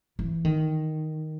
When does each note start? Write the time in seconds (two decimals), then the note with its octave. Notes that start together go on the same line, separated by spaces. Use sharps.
0.19 E3
0.45 D#3